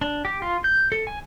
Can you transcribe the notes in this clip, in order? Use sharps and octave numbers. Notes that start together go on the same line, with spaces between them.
D4
G4
F4
G6
A4
G#5